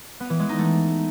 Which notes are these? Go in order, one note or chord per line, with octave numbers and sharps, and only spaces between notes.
B3
E3
G#3
D#4
A3